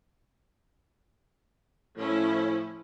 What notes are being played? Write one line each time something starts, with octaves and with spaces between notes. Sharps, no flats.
A2 F3 C#4 E4